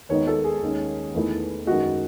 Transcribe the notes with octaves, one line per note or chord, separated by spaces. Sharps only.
D#2 D#3 G#3 B3 D#4 C#5
A4
G#4
D#2 D#3 G#3 C#4
E2 D#3 A3 E4
F#2 D#3 G#3 F#4